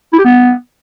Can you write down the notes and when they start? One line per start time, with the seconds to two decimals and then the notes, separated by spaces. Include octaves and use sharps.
0.13 E4
0.19 G4
0.25 B3